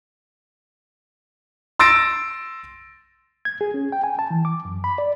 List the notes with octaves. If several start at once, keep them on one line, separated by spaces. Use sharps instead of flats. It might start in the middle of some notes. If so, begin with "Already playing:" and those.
C6 E6 A6 A#6 D7
G#6
G#4
C#4
G5
G#5
A5
E3
D6
F#2
B5
D5